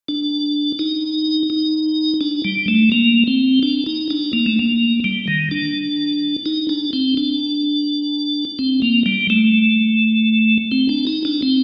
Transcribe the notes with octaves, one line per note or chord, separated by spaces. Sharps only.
D4
D#4
D#4
D4
G3
A3
A#3
C4
D4
D#4
D4
A#3
A3
A#3
G3
D#3
D4
D#4
D4
C4
D4
C4
A#3
G3
A3
C4
D4
D#4
D4
C4